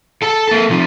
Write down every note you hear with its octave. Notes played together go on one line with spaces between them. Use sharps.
A4 A5
A#3 A4
C3 F3